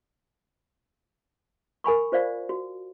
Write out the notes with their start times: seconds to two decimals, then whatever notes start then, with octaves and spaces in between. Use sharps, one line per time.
1.84 A#4 G#5 B5 C#6
2.12 F4 C5 D5 F5
2.49 F#4